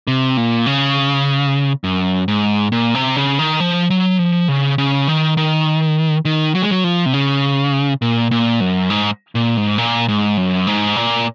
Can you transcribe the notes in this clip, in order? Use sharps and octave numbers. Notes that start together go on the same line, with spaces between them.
C3
A#2
C#3
F#2
G#2
A#2
C3
C#3
D#3
F3
F#3
F3
C#3
C#3
D#3
D#3
D#3
F#3
G#3
F#3
F3
C3
C#3
A#2
A#2
F#2
G#2
A#2
G#2
A#2
G#2
F#2
G#2
A#2